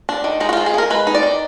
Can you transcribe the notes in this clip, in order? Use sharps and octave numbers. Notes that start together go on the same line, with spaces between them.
D4
D#3
G#3 D#4
F#4
F3 F4
G#4
F3 A#4
G#3 B4
D#4
D5
D#3